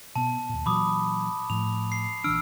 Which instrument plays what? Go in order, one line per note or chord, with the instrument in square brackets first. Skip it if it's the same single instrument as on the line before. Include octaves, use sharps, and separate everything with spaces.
[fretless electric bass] B2 B3 [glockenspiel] A5
[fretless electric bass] D#2 A#2
[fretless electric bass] A#2 E3 F#3 [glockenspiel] B5 D6 D#6
[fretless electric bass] A2 F3 [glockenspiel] F7
[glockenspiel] C7
[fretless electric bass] A#1 E3 D4 [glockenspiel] E6 F6 D7